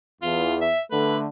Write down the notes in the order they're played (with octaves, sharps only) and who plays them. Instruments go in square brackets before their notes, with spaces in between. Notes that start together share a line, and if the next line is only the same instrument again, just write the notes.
[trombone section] E2 [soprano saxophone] F4
[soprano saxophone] E5
[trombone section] D3 A3 [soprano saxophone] B4